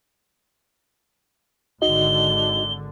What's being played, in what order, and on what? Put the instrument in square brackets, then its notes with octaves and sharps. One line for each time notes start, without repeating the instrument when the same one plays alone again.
[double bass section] G#1 D3 [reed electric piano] D#4 F#4 D#5 [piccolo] G7